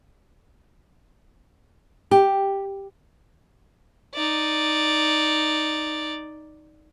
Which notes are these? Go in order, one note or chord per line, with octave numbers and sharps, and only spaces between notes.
G4
D#4 D5